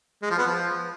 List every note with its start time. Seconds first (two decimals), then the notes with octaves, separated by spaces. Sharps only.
0.22 G#3
0.30 F3
0.38 B3
0.46 F3